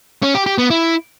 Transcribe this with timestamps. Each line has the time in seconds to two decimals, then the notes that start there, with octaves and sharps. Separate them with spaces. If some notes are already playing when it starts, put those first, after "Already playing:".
0.22 C#4
0.34 G4
0.46 G4
0.58 B3
0.70 E4